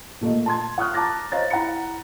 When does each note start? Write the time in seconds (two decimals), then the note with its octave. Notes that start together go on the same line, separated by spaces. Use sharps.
0.21 A#2 A3 A#3 D#5
0.46 A5 C6 G#6
0.78 F#5 C#6 D#6 F6 F#6
0.94 A5 A#5 D6 A6 A#6
1.32 C5 C#5 D#5 F5 A#5 A6
1.50 E4 F#5 A#5 B5 C#7